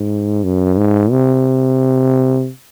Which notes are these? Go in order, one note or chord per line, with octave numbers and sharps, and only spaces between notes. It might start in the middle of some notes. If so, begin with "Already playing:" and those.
Already playing: G#2
F#2
G#2
C3